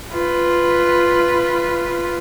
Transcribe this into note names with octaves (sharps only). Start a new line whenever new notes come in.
F4 B4